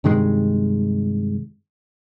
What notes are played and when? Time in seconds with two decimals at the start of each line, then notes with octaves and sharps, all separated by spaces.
0.04 G2 C3 D#3 G#3